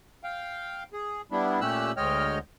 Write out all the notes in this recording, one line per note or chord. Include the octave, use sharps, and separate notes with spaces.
F5 G5
G#4
G3 B3 D4 E4
A#2 A3 C#4 G4 E6 F#6
D2 G#3 C#5 D#5 G5 F6